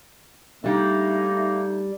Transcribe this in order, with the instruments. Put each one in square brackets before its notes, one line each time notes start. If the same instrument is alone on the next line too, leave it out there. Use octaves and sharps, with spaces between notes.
[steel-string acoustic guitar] G3 D4 [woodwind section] A3 A#3 D#4